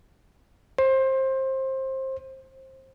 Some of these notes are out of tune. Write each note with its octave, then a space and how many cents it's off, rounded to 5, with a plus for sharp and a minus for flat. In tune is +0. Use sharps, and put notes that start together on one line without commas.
C5 +20